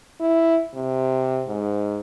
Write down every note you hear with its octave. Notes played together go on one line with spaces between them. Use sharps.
E4
C3
G#2